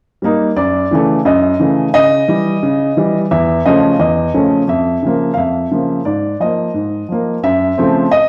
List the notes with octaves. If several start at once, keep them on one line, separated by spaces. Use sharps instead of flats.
G3 A#3 D#4
F#2 D5
C#3 E3 A3
F#2 D#5
C#3 E3 A3
C#3 D#5
E3 G3
C#3
E3 G3
E2 E5
C#3 F3 A3 C#4 D#5
E2 D#5
C#3 F3 A3 C#4
F2 E5
C#3 F3 A#3
F5
F2 E5
C#3 F3 A#3
G#2 D5
F3 A#3 D#5
G#2
F3 A#3
F#2 E5
C#3 F3 A3 C4
D#5